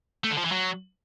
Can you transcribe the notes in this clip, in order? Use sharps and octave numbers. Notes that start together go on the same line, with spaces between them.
A3
D3
F3
E3
F#3